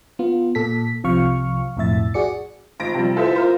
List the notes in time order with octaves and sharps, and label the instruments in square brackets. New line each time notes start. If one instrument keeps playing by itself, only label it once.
[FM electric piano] B3 F4
A#2 A4 B6
C2 C3 F3 F5 C#6 F6
B1 F2 A2 E5 A6
F#4 G#4 D5 C#7
[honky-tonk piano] G#1 F4 A#6 D7
C3 F3 G3
E4 F4 A4 B4 C5 E5
F4 A#4 C5